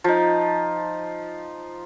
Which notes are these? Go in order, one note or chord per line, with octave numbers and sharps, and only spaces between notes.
F3 D#4